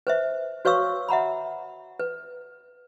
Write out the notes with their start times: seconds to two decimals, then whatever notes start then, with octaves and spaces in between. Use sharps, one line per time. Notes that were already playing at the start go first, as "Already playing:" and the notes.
0.07 B4 C5 E5
0.65 F#4 B4 C#5 F5 C#6 E6
1.09 E5 F#5 A#5 B5
2.00 B4